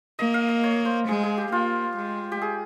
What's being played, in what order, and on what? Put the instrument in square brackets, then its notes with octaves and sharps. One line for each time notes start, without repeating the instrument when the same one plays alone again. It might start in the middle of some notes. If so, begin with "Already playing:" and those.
[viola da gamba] A#3 [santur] D#5
[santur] F5
D#5
C#5
C5
[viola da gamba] G#3 [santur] G#4
[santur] G#4
G4
[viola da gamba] A#3 [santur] F4
[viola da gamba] G#3
[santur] G4
G#4